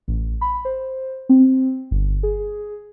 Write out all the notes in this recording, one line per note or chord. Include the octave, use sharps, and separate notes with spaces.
A1
B5
C5
C4
G1
G#4